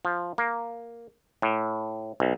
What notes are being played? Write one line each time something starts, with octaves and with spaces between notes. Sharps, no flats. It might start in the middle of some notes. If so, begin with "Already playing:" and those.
F3
A#3
A2
B1